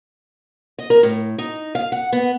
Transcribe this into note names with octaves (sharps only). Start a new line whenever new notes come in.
D#5
A#4
A2
D#4
F5
F#5
B3